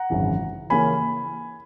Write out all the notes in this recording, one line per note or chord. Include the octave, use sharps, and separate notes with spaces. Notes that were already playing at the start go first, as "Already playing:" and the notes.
Already playing: F#5 A#5
G#1 F#2 C#3 E3
C#3 E3 A#3 C#4 G#5 B5